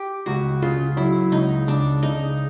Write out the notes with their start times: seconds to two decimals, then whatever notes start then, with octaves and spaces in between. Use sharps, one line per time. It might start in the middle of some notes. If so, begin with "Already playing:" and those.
Already playing: G4
0.26 C#2 F#4
0.62 C#3 F4
0.97 F#3 E4
1.32 C#2 D#4
1.68 C#2 D4
2.03 C#3 D#4